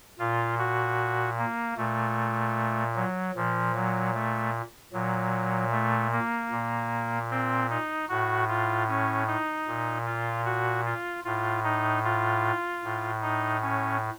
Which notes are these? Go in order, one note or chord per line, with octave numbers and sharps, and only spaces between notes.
A#2 F4
F#4
A#3
A#2 A3
F#3
A#2 F3
F#3
A3
A#2 F#3
A3
A#3
A#2
C4
D#4
A2 F#4
F4
C#4
D#4
A#2
F4
F#4
F4
A2 F4
D#4
F4
A2
D#4
C#4